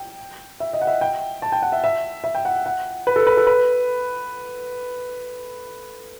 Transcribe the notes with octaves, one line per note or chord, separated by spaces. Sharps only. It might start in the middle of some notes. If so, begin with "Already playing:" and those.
Already playing: G5
E5
D#5
F#5
E5
G5
A5
G5
F#5
E5
E5
E5
G5
F#5
F#5
B4
A4
B4
A4
B4